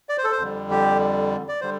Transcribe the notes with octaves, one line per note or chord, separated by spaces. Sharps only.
D5
C5
A4
C5
F2 D3 G3
G4
D5
D3 G3 C5